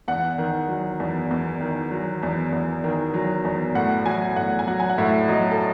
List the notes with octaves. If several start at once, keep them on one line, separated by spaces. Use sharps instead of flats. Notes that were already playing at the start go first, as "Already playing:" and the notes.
E2 F#5
D#3
F#3
E2
E2
D#3
F#3
E2
E2
D#3
F#3
E2
A2 F#5
F#3 G#5
A2 F#5
G#5
F#3 F#5
G#5
F#5
A2 E5
F#3 D#5
A4